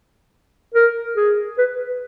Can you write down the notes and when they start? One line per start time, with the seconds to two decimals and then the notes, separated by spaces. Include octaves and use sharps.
0.74 A#4
1.16 G#4
1.58 B4